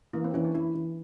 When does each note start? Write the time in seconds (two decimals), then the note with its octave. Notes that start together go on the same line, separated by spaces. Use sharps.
0.13 E3 A#3
0.24 C4
0.34 E3 C#4
0.44 D4
0.55 E3 E4
0.75 E3